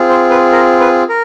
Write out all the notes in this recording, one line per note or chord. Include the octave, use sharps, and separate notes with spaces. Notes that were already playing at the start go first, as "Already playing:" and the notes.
Already playing: C4 F4 G#4
C5
B4
A#4
B4
A#4